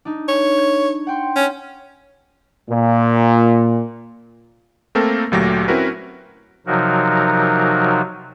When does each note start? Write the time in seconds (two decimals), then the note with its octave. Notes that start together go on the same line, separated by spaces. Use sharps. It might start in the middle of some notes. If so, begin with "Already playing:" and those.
0.05 D4 D#4
0.28 C#5
0.58 G#6
1.07 F#5 G5 C6
1.36 C#4
2.69 A#2
4.95 A3 A#3 C4 A4 A#4
5.32 D2 A#2 F#3 A3 G4 A#6
5.68 C4 C#4 E4 F#4 A#4 B4
6.67 C3 F3 F#3 D#4 F#4 A#4